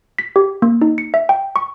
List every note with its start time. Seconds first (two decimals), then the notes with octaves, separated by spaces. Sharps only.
0.19 B6
0.36 G4
0.62 A#3
0.82 D#4
0.98 C#7
1.14 E5
1.29 G5
1.56 C#6